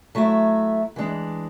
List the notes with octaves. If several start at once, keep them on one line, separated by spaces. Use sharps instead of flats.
F#3 A3 E4
E3 G#3 D4